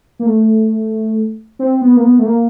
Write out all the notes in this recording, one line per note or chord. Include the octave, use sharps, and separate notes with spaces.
A#3
A3
C4
B3
A#3
B3
A3
A#3